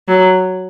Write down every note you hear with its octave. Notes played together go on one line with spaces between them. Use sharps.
F#3